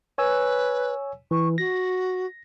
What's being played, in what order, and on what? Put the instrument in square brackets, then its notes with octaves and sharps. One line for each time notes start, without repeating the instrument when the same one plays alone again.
[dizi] B4 [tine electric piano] C#5 G#5 E6
[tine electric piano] E3 [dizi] C#6
[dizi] F#4 [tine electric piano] A#6